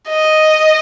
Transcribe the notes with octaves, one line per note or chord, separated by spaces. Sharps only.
D#5